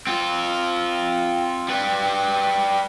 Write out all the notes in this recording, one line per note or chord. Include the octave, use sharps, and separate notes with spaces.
C4 F4
G3 B4